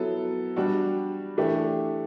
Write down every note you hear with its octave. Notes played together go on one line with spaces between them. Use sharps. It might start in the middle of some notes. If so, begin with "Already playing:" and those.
Already playing: F#3 B3 E4 A4
G3 D4 F#4
E3 A3 D4 G4